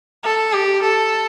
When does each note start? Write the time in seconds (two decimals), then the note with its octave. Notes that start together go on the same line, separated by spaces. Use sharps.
0.24 A4
0.53 G4
0.82 A4